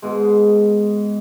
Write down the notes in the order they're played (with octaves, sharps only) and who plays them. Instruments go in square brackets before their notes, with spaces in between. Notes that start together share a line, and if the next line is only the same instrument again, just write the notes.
[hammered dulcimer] G#2 B2 G#3